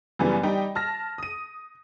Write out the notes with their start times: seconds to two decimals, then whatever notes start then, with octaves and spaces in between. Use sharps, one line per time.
0.19 F#2 C#3 E3 G3 B3
0.43 G3 D#4 G5
0.75 A5 F6 A#6
1.18 D#6 D#7